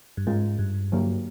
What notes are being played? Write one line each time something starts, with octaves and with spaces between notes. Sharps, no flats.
G2
G#2 G#3 C#4 F4 A#4
G2
D3 F#3 A#3 D4 G4